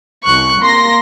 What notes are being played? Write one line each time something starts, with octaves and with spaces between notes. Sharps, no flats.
C2 C#6 F#6
A#3 C6 A#6